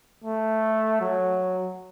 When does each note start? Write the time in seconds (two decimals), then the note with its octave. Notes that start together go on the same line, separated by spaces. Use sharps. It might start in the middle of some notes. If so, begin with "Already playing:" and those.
0.24 A3
1.01 F#3